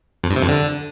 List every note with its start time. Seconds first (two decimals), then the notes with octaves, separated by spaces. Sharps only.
0.24 F2
0.30 G2
0.36 C3
0.42 F2
0.49 D3